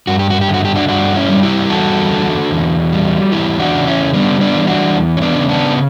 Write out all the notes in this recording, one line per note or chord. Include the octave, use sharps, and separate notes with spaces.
G2 F#4
G4
F#4
G4
D3
F#4
G4
D4 F#4
G2 D4 F#4
C#4 E4
G3
E4 G4
E2 F#4 A4
D3
E2
G3
E2 E4 G4
D4 F#4
C#3
C#4 E4
G3 B3 D4
B3 D4
E3
D4 F#4
E2
C#4
B3 D4
C#3
B3 D4